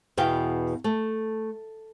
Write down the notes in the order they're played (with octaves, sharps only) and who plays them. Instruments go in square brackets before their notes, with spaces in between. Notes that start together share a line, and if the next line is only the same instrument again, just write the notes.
[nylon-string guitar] E2 B2 F5 G5
A3